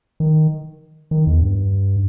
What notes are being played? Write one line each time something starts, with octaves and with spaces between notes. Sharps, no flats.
D#3
D#3
E2
G2